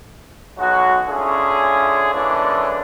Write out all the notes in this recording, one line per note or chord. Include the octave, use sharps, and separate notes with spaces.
B1 F#3 G#3 F#4
D3 C#4 E4 F4 G#4
D3 E3 G#3 A#3 C#4 D4